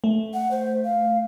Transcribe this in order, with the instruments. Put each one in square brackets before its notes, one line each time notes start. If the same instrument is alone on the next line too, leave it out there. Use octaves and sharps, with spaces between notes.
[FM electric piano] A3
[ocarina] F#5
C5
F5